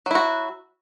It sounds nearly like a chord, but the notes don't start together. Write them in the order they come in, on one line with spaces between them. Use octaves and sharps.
F#3 E4 F#4